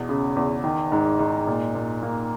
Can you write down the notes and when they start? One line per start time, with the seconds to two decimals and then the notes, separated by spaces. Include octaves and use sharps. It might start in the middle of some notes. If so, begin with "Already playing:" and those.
Already playing: E2 B2
0.09 C#3
0.36 E2
0.64 D#3
0.92 G#2
1.19 G#2
1.47 A#2
1.75 A#2
2.03 A#3